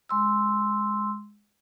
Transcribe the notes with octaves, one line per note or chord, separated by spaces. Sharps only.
G#3 C6 E6